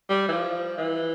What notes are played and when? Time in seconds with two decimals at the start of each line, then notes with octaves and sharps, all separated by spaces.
0.10 G3
0.28 E3
0.32 F3
0.78 E3